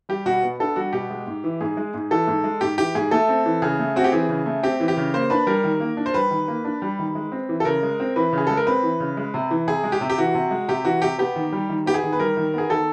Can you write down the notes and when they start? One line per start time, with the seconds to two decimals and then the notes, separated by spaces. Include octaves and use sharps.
0.09 G3 G4
0.26 B2 F#4
0.43 B3
0.60 D4 A4
0.76 G3 F#4
0.93 B2 G4
1.10 G#3
1.27 G#2
1.44 E3
1.61 G#2 G#4
1.77 G#3
1.94 G#2
2.11 E3 A4
2.27 G#2
2.44 G#3
2.61 G#2 G4
2.78 E3 G4
2.95 G#2 G#4
3.11 A3 A4
3.29 C4
3.46 E3
3.62 C#3 G#4
3.79 A3
3.96 C4 F#4
4.04 G4
4.12 E3 G#4
4.29 C#3
4.46 A3
4.63 C4 G4
4.80 E3
4.88 G4
4.97 C#3
5.14 A#3 C5
5.30 D4 B4
5.47 G3 A#4
5.64 D#3
5.80 A#3
5.97 D4
6.06 C5
6.14 G3 B4
6.31 D#3
6.48 A#3
6.65 D4
6.82 G3
6.99 D#3
7.15 G#3
7.32 C4
7.49 E3
7.60 A4
7.65 C#3 A#4
7.83 G#3
8.00 C4
8.16 E3 B4
8.33 C#3
8.38 G#4
8.47 G#3 A4
8.57 A#4
8.67 C4 B4
8.83 E3
9.00 C#3
9.17 G#3
9.34 C3
9.51 E3
9.67 C3 G#4
9.84 G#3
9.92 G4
10.01 C3
10.10 G4
10.18 E3 F#4
10.34 C3
10.51 G#3
10.68 C3 G4
10.85 E3 F#4
11.02 C3 G4
11.18 B3 G4
11.36 D#3
11.52 G3
11.69 D#3
11.86 B3 G4
11.94 G#4
12.03 D#3
12.13 B4
12.20 G3 A#4
12.37 D#3
12.54 B3 G#4
12.70 D#3 A4